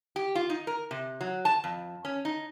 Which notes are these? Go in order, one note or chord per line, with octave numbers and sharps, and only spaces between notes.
G4
F4
D#4
A#4
C3
F#3
A5
F2
C#4
D#4